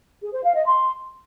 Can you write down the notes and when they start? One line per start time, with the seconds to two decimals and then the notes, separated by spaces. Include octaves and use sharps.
0.22 G#4
0.33 C5
0.44 F5
0.55 D#5
0.66 C6